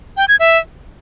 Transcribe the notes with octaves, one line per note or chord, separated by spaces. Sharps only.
G5
G#6
E5